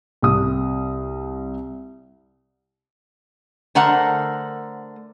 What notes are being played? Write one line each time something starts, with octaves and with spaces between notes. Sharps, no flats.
C2 D#6
D3 A3 A#4 C5 F#5